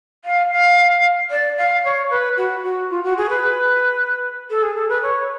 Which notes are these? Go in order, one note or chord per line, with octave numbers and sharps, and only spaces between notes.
F5
F5
D5
F5
C#5
B4
F#4
F#4
F4
F#4
G#4
B4
A4
G#4
A4
B4
C#5